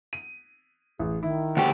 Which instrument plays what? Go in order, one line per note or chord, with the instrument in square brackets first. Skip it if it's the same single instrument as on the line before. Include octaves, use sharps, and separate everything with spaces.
[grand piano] D#7
[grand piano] A1 [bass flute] G#4
[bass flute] D#3 [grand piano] E4
[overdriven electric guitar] D2 G4 [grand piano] F#5 C#6